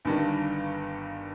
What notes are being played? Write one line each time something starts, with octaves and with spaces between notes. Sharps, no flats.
G1 G2 D#3